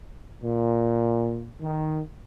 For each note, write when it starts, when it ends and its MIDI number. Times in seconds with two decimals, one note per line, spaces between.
0.43 1.48 46
1.61 2.00 51